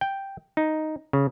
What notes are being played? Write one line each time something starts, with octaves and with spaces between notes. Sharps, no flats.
G5
D#4
C#3